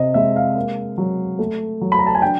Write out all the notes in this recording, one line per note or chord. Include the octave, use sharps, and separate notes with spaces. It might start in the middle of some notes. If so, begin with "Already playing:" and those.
Already playing: C3 D#5
G#3 E5
F5
A#3
F#3
A3
F#3
B5
A#5
A5
G#5
D4 G5